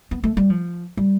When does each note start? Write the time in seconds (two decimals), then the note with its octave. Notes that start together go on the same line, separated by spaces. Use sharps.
0.11 B3
0.24 A3
0.37 G3
0.50 F3
0.97 G3